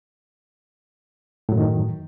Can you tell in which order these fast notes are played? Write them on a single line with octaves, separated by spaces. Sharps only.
A2 F#3 F#2 D#3